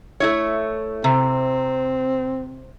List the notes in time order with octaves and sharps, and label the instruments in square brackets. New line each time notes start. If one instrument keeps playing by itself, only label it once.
[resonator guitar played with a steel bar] A3 E4 C#5
[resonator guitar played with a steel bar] C3 [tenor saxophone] C4